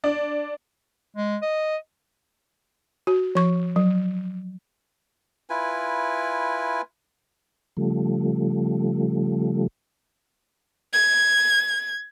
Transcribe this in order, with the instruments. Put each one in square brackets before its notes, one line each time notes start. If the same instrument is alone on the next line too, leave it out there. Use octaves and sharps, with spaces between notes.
[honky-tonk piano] D4
[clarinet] G#3
D#5
[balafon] F#4
F3 C#6
F#3
[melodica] E4 F4 B4 G#5
[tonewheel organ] C#3 F3 G3 A3
[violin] G#6